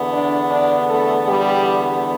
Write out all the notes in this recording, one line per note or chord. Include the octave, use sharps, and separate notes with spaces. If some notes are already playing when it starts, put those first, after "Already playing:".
Already playing: E2 D3 B3
D4 D5
D4 D5
A3 A4
G3 G4